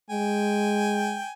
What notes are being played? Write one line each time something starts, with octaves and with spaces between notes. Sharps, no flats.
G#3 G5 G#5